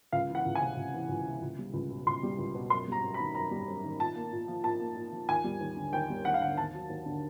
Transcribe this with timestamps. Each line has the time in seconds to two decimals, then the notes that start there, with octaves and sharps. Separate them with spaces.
0.13 C#2 F5
0.30 E3
0.35 F#5
0.46 C#2
0.55 G#5
0.61 C3
0.77 C#2
0.94 E3
1.09 C#2
1.27 C3
1.42 C#2
1.59 G3
1.74 C#2
1.91 B2
2.06 C#2 C6
2.23 G3
2.39 C#2
2.55 B2
2.70 F#2 C6
2.88 G3 A#5
3.04 F#2
3.14 B5
3.20 D#3
3.35 F#2 A#5
3.51 G3
3.68 F#2
3.84 D#3
4.00 A#2 A5
4.15 A#3
4.33 A#2
4.48 F3
4.64 A#2 A5
4.80 A#3
4.96 A#2
5.13 F3
5.29 D#2 G#5
5.44 G3
5.61 D#2
5.77 D3
5.93 D#2 G5
6.10 G3
6.25 D#2 F#5
6.34 F5
6.41 D3 F#5
6.57 D#2 A5
6.74 F#3
6.90 D#2
7.06 D3